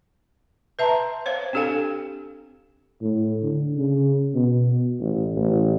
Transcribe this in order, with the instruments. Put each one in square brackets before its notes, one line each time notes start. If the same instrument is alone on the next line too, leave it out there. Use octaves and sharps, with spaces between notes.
[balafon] B4 E5 A5 A#5 C6
C5 C#5 F5
C4 D4 G4 A4 F5 G#5
[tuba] A2
D3
C#3
B2
A1
A1